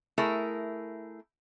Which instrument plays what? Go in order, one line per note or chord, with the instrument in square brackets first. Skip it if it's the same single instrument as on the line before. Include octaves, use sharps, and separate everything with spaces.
[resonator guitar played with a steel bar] A3 E4 G#4 A#4 E5